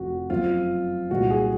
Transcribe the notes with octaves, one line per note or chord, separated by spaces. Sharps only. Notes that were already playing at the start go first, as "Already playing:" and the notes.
Already playing: F1 F2 C#3 F3 F#4
F#2 F3 C4 F4
C2 A#2 G#3 F#4
G#4